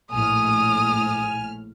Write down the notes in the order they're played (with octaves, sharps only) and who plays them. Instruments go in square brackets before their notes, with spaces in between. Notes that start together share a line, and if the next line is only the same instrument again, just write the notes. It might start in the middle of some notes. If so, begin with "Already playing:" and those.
[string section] A#1 A2 F6 [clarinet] G#5 [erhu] D#6